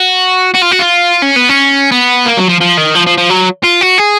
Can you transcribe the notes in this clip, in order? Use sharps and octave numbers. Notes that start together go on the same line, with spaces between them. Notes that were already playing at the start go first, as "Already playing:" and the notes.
Already playing: F#4
F#4
F4
F#4
F4
C#4
B3
C#4
B3
A#3
F#3
F3
F3
D#3
F3
F3
F3
F#3
F4
F#4
G#4